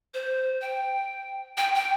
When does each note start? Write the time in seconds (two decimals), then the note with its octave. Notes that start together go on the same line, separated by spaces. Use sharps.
0.14 C5
0.62 G5
1.57 G5
1.75 G5